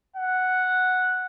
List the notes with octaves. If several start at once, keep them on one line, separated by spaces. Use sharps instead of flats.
F#5